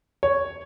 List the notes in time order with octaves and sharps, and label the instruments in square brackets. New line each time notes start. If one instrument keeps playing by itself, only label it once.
[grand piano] C#5